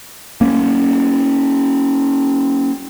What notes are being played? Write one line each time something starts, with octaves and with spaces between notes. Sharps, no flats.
A#3 C#4